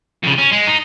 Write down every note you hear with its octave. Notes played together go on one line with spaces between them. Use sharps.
F2 C#3
C#4
G#3
D#4